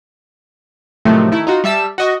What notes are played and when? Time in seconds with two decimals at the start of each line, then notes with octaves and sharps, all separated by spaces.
1.05 A2 C3 D#3 F3 F#3 A3
1.32 D#3 A3 E4
1.47 D#4 F4 F#4
1.64 G3 E5 A5 E6
1.98 F#4 D#5 C#6